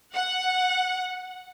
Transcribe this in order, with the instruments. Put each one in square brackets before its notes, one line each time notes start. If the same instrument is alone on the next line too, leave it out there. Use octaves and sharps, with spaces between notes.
[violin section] F#5